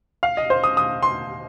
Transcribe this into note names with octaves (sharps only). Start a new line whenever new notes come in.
F5
D#5
C5
D#6
D#6
C6